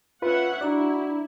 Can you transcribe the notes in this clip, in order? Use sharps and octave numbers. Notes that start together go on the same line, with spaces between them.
C#4 F4 B4 E5 F#5
D4 E4 F#4 D5 A#5